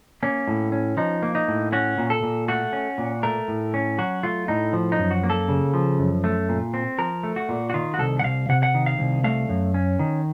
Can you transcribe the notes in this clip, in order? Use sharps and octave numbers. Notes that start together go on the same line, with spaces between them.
A#3 C#4
A2
C#4
F3 D#4
A#3
D#4
A2
C#4 F#4
A#2
A4
A#2
A3 F#4
C#4
A#2
A3 A#4
A2
C#4
F#3 F#4
A3 F4
A2 D#4
F3
D#4
F#2
F#4
A#3
A4
C#3
F3
F#2
A3
A#2
C4
F3 A#4
A3
F#4
A#2
F#4
D#3 F4
F#4
C2 A4
F#5
C2 F5
C3 F#5
F#5
D#3
F5
C2
A3 F5
F#2
C#4
D#3